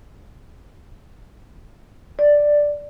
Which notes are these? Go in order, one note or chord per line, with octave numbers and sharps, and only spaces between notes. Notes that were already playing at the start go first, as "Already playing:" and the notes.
D5